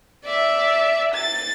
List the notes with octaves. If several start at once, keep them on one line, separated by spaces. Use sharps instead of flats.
D5 E5
A6